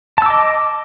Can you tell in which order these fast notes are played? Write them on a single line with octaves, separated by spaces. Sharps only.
A5 E6 D6 D#5